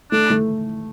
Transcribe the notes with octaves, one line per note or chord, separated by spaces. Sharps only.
A3 D4
A3